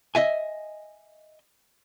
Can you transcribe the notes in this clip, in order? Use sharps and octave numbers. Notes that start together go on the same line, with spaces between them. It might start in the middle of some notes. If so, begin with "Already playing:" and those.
D#5 E5 G#5